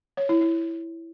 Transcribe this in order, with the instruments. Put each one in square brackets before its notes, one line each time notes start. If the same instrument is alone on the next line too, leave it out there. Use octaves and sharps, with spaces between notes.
[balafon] C#5
E4
E4